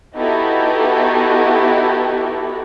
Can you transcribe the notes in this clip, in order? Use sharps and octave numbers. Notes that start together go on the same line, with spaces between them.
B3 D#4 E4 F#4 G4 A4